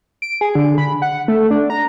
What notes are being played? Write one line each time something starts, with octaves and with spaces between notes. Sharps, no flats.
D7
G#4
D3
B5
F#5
A3
D4
A#5